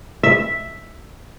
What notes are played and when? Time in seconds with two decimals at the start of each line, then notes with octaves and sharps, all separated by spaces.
0.23 E5